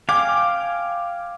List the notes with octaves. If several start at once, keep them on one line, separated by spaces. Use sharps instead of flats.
F5 G5 G#5 D6